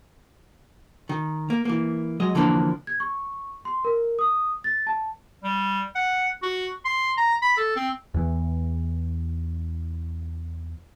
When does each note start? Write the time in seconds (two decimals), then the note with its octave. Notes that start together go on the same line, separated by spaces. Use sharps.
1.09 D#3
1.50 A#3
1.65 E3 A#3
2.20 F#3 G#3 D#5
2.35 D3 E3 F3 A#3 D4
2.87 G#6
3.00 C#6
3.65 C6
3.85 A#4
4.19 D#6
4.64 A6
4.87 A5
5.44 G3
5.95 F#5
6.43 F#4
6.85 C6
7.18 A#5
7.42 B5
7.57 A4
7.76 C4
8.14 E2 E3